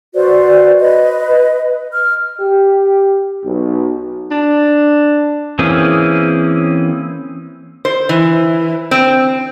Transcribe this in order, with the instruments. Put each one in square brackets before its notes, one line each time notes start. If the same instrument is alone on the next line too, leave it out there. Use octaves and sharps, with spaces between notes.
[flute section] F#4 B4 C5 D5
B4 D#5
F6
[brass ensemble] G4
B1
[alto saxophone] D4
[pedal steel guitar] E3 A#3 C4 C#4 G#4
[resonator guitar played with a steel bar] C5
E3
C4